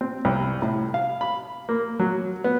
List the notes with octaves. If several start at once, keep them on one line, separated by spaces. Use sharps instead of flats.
C4
C2
A2
F5
B5
A#3
F#3
B3